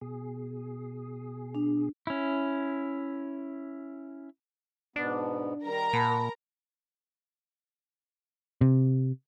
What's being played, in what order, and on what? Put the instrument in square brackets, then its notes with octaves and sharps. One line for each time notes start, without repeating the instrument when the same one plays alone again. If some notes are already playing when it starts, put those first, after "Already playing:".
[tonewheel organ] B2 G#4
[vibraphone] D4
[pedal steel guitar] C#4 E4
[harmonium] G#2 B2 B3 [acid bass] D4
[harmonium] D#3 G3 [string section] A#4 A#5
[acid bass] A#2 [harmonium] F#5 [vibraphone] A5 B5
[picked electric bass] C3